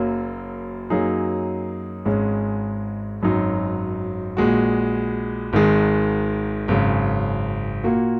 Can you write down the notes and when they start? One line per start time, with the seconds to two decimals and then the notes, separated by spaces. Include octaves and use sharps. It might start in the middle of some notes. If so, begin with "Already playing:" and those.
Already playing: F#1 F#2 F#3 A#3
0.90 F#2 F#3 A#3 D#4 G#4
2.05 G#1 G#2 G#3 C#4
3.22 G#1 F#2 F#3 D#4
4.37 A#1 A#2 G#3 F#4
5.53 G#1 G#2 D#3 G#3
6.68 G#1 F#2 C#3
7.84 A#2 A#3 F#4